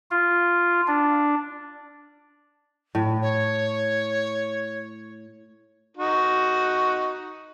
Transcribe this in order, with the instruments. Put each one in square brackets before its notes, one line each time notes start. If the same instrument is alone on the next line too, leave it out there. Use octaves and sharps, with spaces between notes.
[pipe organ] F4
D4
[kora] A2
[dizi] C#5
[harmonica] D#4 F#4